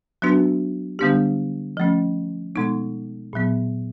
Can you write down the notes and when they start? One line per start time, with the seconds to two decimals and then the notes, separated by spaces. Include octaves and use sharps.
0.22 F#3 B3 D4 F#4 B4
0.99 D3 G3 B3 D4 G4
1.77 F3 A3 C#4
2.55 B2 G#3 B3 D#4
3.33 A#2 F#3 B3